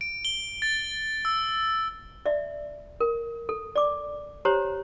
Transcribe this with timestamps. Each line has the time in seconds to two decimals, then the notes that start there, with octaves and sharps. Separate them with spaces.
0.01 D7
0.25 G7
0.62 A6
1.25 E6
2.26 D5 E5
3.00 A#4
3.49 A4
3.76 D5 D6
4.45 G4 C5 C#5 A#5